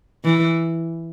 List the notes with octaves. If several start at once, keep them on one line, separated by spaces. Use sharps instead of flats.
E3